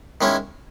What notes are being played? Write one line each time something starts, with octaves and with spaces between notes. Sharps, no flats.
D#3 G#3 C#4 E4